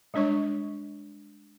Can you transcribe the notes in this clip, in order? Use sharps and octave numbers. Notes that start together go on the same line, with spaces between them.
G3 G#3 D4 C#5 C#6